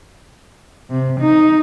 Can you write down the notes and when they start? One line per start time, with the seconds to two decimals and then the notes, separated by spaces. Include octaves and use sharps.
0.90 C3
1.20 D#4